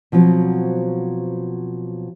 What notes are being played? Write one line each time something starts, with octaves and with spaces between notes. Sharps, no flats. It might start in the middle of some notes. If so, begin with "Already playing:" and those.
B2 F3 F#3 C4